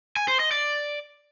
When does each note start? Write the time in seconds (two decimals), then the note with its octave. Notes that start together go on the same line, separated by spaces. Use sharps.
0.17 G#5
0.28 C5
0.40 D#5
0.51 D5